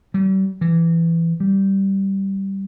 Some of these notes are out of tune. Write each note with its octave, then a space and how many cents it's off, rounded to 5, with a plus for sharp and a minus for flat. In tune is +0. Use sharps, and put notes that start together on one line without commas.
G3 -40
E3 +15
G3 -10